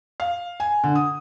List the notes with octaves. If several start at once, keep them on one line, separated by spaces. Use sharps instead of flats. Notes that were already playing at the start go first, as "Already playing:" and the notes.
F5
G#5
D3
D#6